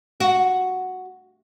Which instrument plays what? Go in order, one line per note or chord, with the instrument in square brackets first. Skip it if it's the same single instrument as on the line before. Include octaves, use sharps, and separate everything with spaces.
[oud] F#4